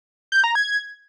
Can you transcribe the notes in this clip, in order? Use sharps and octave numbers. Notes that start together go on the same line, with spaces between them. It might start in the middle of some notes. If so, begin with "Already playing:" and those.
G6
A#5
G#6